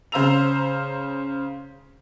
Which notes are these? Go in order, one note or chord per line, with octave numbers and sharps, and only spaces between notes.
C#3 C5 F5 A#5 E6 F7